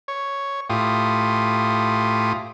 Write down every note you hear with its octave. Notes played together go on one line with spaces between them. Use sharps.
C#5
A2 F4 G4 D#6